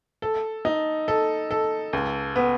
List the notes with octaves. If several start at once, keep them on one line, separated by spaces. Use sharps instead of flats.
A4
D#4
A4
A4
C#2
B3